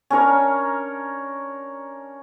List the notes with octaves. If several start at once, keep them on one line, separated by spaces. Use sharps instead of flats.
C#4 D4 A#4 C#5